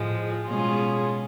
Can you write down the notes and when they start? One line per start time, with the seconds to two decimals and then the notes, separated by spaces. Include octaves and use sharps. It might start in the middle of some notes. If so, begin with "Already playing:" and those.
Already playing: A2 F3 G#3
0.46 B2 G#3 C#4 F4 G#4